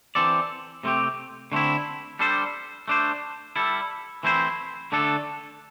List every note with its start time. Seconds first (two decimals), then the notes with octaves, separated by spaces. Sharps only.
0.15 E3 C4 A4 D5
0.83 C3 A3 C4 G4
1.52 D3 A3 C4 E4
2.19 G3 D4 A4 C5
2.88 A3 D4 C5
3.56 G3 E4 A4
4.23 E3 A3 C4 E4 C5
4.92 D3 A3 D4 A4